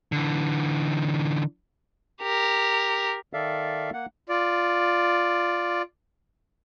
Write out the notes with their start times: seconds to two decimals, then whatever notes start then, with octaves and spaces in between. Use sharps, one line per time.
0.12 D3 E3
2.22 G4 A#4
3.33 D#3 A4 D5 E5 F5
3.93 A#3 F#5
4.29 F4 D5